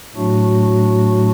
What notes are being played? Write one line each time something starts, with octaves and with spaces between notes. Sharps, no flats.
A2 F#3 A3 D4 F#4